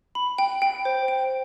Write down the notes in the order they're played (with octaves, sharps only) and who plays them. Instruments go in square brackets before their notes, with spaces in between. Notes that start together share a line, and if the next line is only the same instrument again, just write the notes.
[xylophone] B5
G5
G5
C5
G5